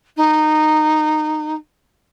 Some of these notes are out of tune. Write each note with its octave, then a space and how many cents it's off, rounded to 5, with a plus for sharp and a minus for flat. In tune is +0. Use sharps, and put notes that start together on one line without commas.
D#4 -15